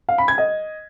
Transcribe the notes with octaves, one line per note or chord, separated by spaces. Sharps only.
F5
B5
G#6
D#5